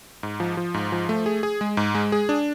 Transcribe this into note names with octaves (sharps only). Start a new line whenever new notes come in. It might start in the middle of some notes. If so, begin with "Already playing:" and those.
G#2
F3
F3
G#2
F3
A3
G#4
G#4
G#3
G#2
G#3
G#4
D4